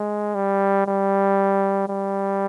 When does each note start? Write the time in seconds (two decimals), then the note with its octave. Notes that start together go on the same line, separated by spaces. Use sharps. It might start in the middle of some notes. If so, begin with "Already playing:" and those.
Already playing: G#3
0.35 G3
0.87 G3
1.88 G3